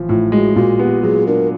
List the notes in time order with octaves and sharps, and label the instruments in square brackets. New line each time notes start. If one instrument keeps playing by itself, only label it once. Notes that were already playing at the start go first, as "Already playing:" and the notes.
Already playing: [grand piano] A1 F3
[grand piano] A2 [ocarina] F4
[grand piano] G#3 [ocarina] F#4
[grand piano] A#2 [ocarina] F#4
[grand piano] B3 [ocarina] G4
[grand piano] F#3 [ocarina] G#4
[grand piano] D4 [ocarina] A#4